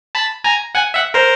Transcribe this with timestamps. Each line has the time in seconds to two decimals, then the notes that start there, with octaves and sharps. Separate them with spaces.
0.15 A5 B5
0.44 G#5 A#5
0.75 F#5 G#5
0.94 E5 F#5
1.14 A#4 C5